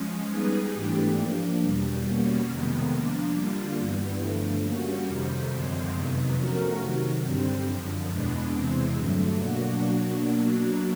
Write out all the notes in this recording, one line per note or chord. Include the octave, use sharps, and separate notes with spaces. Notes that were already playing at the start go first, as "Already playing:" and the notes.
Already playing: F3 G#3 C#4
G3 B3 D#4 G#4 B4
G#2 E3 A3 D4 G4
F3 A#3 D4
E2 B2 G3
B2 G3 A#3 C#4 F#4
F2 C3 D#3 G#3 B3
F3 A#3 D4
D3 G3 A#3 D4 F4
G2 E3 G3 B3
G2 D3 F3 A3
G3 A#3 C#4 F#4
F2 C3 D#3 G3
F#2 D3 F3 G#3 C4
F2 C3 D#3 F#3 B3
F3 A3 C#4 F#4 A#4
C3 D#3 F#3
G2 D3 G3 C4
F#2 D3 F3
E2 B2 G#3 B3 D4
E2 C3 E3 G#3 C4
G2 D3 F#3 A3
B2 F#3 A#3 D4 F#4